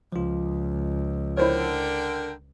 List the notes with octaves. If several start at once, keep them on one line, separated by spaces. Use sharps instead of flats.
C#2 F3 F4
D3 E4 A#4 C5 C#5 G5